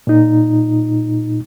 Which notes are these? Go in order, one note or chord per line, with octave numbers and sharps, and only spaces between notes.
A#2 D#4